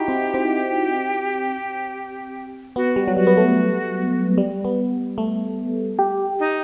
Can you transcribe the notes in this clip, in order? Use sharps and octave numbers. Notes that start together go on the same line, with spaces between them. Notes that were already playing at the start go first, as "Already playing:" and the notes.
Already playing: D#4 E4 F#4 G4
C4
C4
B3 F#4
G3
F#3
G3 F#4
B3
A3
G3
B3
A3
G4
D#4